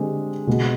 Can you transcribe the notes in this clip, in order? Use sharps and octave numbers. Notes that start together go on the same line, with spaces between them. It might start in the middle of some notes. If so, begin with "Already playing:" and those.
Already playing: D3 G#3 C4 G4
B2 G#3 B3